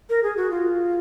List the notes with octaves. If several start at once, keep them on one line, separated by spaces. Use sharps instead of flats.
A#4
G#4
F#4
F4